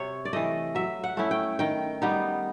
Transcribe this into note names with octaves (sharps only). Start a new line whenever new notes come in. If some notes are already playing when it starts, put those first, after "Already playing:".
Already playing: C3 C#5
D5
E3 A3 D#5
F#3 E5
F#5
A3 C#4 E4
G5
D#3 G5
G3 B3 D#4